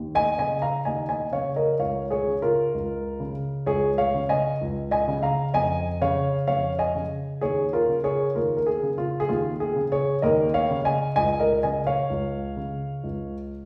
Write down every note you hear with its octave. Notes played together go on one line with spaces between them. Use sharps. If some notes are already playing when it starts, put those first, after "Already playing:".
Already playing: D#2
D#5 G#5
C#3 D#5 G#5
F5 A#5
D#2 D#5 G#5
D#5 G#5
C#3 C#5 F5
A#4 D#5
C#2 C#5 F5
G#4 C#5
C#3
F4 A#4
C#2
C#3
C#2 G#4 C#5
C#5 F5
C#3
D#5 G#5
C#2
D#5 G#5
C#3
F5 A#5
F2 D#5 G#5
C#3 C#5 F5
F2 C#5 F5
D#5 G#5
C#3
D#2 G#4 C#5
F4 A#4
C#3
G#4 C#5
D#2 F4 A#4
A#4
G#4
C#3
F4
G#4
D#2 F4
G#4
C#3
G#4 C#5
D#2 A#4 D#5
C#5 F5
C#3
D#5 G#5
C#2 D#5 G#5
A#4 D#5
C#3 D#5 G#5
C#5 F5
C#2
C#3
C#2